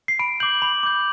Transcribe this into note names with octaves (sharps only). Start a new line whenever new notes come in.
C7
B5 D7
D6 G6 F#7
B5
D6 G6